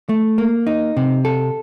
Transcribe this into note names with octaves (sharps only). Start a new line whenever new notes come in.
A3
A#3
D#4
C3
A4